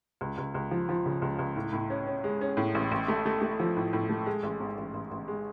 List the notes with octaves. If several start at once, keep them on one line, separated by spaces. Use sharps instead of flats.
C#2
C#2
C#2
F3
F3
C#3
C#2
C#2
A2
A2
C#4
C#4
G#3
C#4
A2
A1
A1
A3
A3
A3
F3
A2
A2
A3
G#3
A1
G#2
A1
A1
A1
G#3